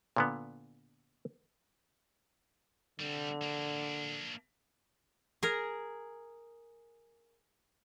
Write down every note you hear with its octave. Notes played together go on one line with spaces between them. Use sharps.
A#2 D3 B3
D3 G3 C4
A#3 D4
G#4 A#4